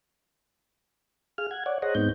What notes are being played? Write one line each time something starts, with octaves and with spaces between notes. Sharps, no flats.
G#4 F5 F6
F#5 G#6
C#5 D5 F#5
G#4 C5 C#5 D#5 F#5 A#5
G#2 G#3 B3 C4 D#4 G6